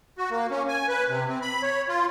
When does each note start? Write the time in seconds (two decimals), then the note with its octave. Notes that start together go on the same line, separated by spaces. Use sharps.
0.18 F#4
0.31 A#3
0.51 C#4
0.69 G#5
0.88 B4
1.09 C3
1.28 C4
1.42 B5
1.63 C#5
1.89 F4